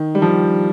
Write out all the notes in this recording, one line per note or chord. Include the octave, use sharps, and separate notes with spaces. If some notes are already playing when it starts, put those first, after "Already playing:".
Already playing: D#3
G3
F3